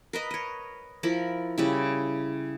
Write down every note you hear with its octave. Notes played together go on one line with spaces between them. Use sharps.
A#4 B4 D#5
C#5 D#5
F3 E4 A#4
C#3 G3 E4